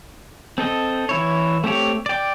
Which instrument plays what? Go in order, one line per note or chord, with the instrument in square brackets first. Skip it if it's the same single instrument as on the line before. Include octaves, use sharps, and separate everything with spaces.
[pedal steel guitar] C4 A4 D#5
E3 E4 C#5
A3 C4 G4 C#5
D5 G5